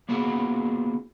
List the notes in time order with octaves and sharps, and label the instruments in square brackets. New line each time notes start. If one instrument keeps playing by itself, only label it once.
[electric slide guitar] A#3 B3 E4 F#4 G#4